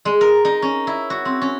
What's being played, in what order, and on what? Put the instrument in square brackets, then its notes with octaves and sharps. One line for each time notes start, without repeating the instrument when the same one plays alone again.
[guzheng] G#3
A#4
D#4
C#4
E4
F#4
C4
C#4